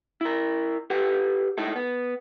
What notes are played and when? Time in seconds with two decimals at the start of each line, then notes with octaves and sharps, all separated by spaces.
0.21 E4 A#4
0.90 G4 A4 B4 F#5
1.58 G#2 D#4 E4 A4
1.76 B3